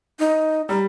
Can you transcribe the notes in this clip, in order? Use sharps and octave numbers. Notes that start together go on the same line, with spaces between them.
D#4
G3 A#5